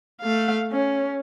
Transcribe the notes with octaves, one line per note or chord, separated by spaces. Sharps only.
A3 F5
C#4